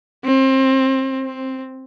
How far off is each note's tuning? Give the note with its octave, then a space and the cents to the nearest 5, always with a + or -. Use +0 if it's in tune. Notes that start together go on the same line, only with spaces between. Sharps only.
C4 +25
C4 +5